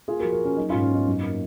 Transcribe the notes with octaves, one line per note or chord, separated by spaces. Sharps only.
A#3 F4 G#4
F#4 A#4
F3
F#4 A#4
A#3 C#4
F#3 D#4
C#4 F4
G#2
C#4
B3 D#4
F#2
A#3